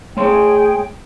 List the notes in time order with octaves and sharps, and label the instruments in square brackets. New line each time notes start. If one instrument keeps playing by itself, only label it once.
[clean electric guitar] A3 C#5 C6 [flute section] G#4 G5